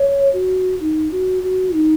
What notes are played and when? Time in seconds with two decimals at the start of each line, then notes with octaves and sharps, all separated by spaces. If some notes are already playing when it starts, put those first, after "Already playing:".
Already playing: C#5
0.33 F#4
0.80 D#4
1.12 F#4
1.43 F#4
1.75 D#4